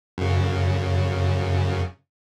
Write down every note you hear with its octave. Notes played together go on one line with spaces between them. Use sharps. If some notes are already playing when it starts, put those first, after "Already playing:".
F#2 C#3